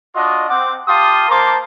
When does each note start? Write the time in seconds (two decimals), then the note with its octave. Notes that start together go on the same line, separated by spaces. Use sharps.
0.15 D4 F4 F#4 D#5
0.48 C4 F#5 D6
0.87 F4 G4 F5 A5 C6 D#6
1.29 A#3 A#4 C5 A5 C6 D6